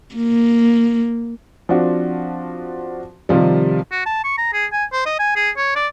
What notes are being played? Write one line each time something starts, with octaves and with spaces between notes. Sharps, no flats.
A#3
F3 C4 D4 F#4
C3 D#3 F3 G3
F#4
A5
C#6
A#5
G#4
G#5
C5
D#5
G#5
G#4
C#5
D5